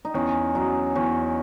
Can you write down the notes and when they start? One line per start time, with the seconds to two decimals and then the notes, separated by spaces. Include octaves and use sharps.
0.05 D#4
0.14 E2 C#4
0.55 F#3 D#4
0.95 E2 C#4